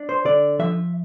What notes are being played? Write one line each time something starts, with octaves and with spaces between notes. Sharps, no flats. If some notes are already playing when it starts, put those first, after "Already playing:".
Already playing: D4
C5
D3 D5
F3 E5